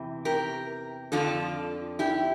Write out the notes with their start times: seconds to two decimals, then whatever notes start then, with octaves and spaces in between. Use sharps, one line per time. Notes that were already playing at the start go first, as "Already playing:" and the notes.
Already playing: E2 C3 E3
0.25 G4 A#4
1.12 F2 D3 F3 F4 A4
1.99 E4 G4